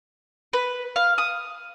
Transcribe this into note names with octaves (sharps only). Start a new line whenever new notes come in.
B4
F5
D#6